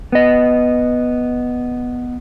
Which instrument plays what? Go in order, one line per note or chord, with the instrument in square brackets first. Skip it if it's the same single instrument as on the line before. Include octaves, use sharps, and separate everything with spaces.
[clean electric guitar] B3 D#5